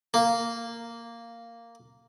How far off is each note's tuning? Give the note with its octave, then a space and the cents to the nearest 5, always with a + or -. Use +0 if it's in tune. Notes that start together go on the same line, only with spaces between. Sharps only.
A#3 -5